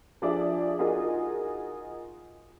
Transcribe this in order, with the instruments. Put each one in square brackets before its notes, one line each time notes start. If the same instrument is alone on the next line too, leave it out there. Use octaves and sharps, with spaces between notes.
[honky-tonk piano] F3 D4 F4 G#4 D5 E5
D#4 F4 F#4 G#4 A#4